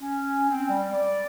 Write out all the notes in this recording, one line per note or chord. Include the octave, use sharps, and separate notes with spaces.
C#4
C4
G3
D5